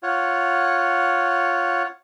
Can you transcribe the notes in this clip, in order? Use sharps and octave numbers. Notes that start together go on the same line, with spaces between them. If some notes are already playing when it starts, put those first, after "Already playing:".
F4 C#5 F#5